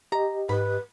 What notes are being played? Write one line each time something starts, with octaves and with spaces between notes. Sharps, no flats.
G4 D#5 A#5
G#2 B4 B5